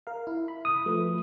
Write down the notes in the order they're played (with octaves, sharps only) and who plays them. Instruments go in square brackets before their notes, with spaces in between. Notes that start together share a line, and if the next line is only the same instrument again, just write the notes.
[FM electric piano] A#4 F5
E4
B5
[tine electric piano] D#6
[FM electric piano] F3 A3 B4